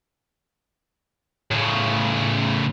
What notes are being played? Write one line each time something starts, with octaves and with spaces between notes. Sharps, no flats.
A2 C#3